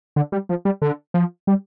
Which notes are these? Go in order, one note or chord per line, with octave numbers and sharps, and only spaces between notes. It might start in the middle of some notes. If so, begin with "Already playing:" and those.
D3
G3
F3
G3
D3
F3
G3